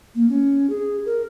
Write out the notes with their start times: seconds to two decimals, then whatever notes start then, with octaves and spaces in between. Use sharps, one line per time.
0.15 A#3
0.29 C#4
0.70 G#4
1.06 A#4